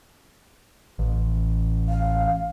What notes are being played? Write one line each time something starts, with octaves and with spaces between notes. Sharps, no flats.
A1
F5